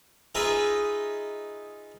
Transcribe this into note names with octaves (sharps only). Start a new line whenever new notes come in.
D#4 F4 G#4 B4 D#5 E5